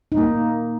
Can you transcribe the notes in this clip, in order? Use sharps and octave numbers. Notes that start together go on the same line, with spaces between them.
D#4
A#3